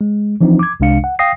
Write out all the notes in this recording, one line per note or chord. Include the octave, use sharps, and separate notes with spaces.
G#3
E3 F3 C4 D4 D#4
D6 G#6
C2 C3 G#3 D4 F5 C#7
F#5
F5 G5 D#6 A#6 C7